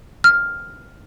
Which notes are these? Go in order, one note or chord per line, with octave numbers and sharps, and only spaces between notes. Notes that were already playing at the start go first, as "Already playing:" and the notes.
F6